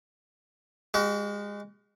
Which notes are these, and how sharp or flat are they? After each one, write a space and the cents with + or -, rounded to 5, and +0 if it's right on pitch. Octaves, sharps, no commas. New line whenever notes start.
G#3 -25 F#4 +40